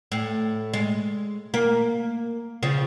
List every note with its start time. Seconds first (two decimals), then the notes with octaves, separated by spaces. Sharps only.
0.12 A2
0.74 G#3
1.54 A#3
2.63 C#3 F3